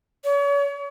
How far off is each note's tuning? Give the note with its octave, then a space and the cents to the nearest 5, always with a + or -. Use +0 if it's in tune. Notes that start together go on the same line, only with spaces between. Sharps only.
C#5 +40